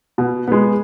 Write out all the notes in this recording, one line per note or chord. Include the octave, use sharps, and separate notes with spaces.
B2
G#3 B3